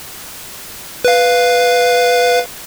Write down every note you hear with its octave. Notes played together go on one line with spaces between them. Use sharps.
B4 F5